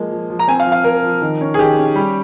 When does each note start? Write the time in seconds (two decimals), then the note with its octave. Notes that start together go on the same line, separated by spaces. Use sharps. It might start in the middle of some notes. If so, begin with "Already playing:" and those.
Already playing: F3 G#3 A#3
0.12 F3
0.30 F3
0.39 A#5
0.48 C4 G#5
0.60 F5
0.67 F3
0.72 F5
0.84 F3 A#4
1.04 F3
1.22 D#3
1.41 C#4
1.54 G#4
1.58 D#3 G4
1.78 C#4
1.96 G3